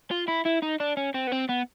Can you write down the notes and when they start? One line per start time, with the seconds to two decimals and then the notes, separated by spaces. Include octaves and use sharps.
0.11 F4
0.28 E4
0.46 E4
0.63 D#4
0.80 D4
0.97 C#4
1.15 C4
1.27 B3
1.32 C4
1.49 B3